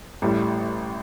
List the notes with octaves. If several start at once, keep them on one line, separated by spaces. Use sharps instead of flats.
A1 A2 G3